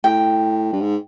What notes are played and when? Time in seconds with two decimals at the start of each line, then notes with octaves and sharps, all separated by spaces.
0.04 A2 G5
0.73 G2
0.82 G#2